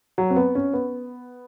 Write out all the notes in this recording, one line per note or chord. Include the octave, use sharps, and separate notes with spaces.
F#3
C4
B3
C#4
B3